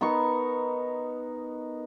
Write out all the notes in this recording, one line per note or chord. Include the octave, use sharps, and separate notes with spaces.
B3 D#4 A#4 C#6